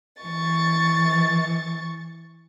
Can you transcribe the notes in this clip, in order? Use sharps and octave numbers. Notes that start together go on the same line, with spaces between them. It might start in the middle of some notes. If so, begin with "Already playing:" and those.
E3 C#6 A6